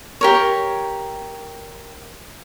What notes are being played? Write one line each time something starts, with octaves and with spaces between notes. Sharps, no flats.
G4 A#4 C#5